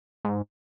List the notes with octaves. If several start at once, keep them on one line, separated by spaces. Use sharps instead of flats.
G#2